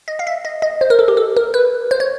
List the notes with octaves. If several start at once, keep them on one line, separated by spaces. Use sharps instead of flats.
D#5
F5
E5
D#5
D#5
C5
A#4
A4
G4
A4
A#4
B4
C5
C#5